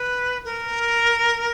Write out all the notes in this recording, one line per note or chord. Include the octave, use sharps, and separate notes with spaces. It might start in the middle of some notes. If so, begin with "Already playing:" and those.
Already playing: B4
A#4